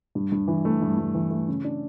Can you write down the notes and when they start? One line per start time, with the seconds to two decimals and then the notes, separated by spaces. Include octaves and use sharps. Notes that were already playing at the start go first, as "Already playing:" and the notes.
0.15 G2
0.32 G2
0.48 E3
0.65 A3
0.82 G2
0.98 G2
1.15 E3
1.31 A3
1.48 C#3
1.64 D4